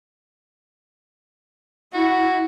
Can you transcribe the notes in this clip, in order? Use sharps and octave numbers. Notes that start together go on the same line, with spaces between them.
E4 F#4